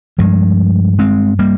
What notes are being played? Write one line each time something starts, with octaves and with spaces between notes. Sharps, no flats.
G2 F3 G#3
G#3 C4
G3 A#3